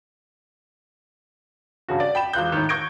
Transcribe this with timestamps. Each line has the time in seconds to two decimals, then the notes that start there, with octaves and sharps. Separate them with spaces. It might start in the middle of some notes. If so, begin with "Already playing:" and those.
1.88 G2 C#3 F#4
2.00 D5
2.15 G5 B5 E7
2.33 E1 F4 F#6 G6
2.52 A2 D#3
2.69 C#6 G6 G#6 A#6 D7